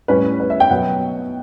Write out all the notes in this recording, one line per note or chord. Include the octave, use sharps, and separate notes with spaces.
A2 G3 C#4 B4
B4
E5
G5
B2 F#3 B3 F#5